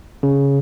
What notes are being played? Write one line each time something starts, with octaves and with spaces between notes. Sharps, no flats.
C#3